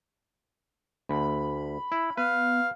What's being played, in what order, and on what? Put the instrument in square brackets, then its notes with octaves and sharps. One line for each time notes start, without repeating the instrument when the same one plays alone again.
[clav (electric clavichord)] D2 [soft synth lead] B5
[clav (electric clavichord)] E4
[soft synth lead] B3 [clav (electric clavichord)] B4 [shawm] F5